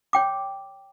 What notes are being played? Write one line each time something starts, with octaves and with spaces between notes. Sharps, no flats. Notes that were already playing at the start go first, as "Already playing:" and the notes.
C#5 G5 D6